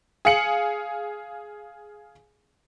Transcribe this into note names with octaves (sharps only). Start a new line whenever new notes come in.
G#4 F5 C#7 F#7